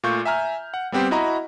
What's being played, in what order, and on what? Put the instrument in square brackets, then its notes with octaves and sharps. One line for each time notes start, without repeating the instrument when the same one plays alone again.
[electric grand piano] A#2 A3 F4 C#6 G6
E5 G#5 A#5 F6
F#5
G3 B3 C4 G4 C5
E4 F#4 D#5 A#5 B5